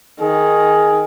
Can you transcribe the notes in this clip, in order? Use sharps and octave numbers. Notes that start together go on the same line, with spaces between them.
D#3 G#4